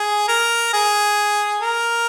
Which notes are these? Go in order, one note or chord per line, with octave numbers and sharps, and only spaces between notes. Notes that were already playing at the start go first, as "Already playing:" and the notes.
Already playing: G#4
A#4
G#4
A#4